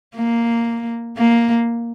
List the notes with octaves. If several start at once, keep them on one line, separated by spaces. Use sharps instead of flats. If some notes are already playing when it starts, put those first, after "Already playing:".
A#3
A#3